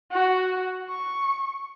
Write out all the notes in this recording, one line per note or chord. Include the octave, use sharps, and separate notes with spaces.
F#4
C#6